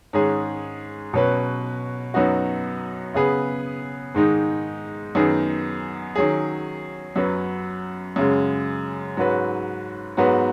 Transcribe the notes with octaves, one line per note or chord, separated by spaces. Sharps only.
G#2 D#3 G#3 C#4 G#4
B2 F#3 C#4 B4
F#2 F#3 B3 D#4 F#4
C#3 B3 G#4 B4
G#2 D#3 G#3 D#4
F#2 D#3 B3 D#4 G#4
D#3 F#3 C#4 G#4
F#2 F#3 C#4 B4
F#2 C#3 G#3
G#2 F#3 C#4 F#4 B4
G#2 F#3 B3 F#4 B4